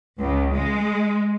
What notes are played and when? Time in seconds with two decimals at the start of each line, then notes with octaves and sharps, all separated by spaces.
0.19 C#2
0.54 G#3